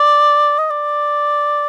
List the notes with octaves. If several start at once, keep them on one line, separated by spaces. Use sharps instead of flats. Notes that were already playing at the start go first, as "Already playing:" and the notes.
Already playing: D5
D#5
D5